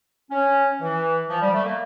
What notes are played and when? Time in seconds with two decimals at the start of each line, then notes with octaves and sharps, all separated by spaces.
0.31 C#4
0.81 E3
1.29 F3
1.41 G3
1.53 A3
1.65 A#3